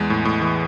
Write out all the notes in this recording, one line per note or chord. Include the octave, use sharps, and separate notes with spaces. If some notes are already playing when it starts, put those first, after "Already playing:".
Already playing: E2 G#3
A2
A2
E3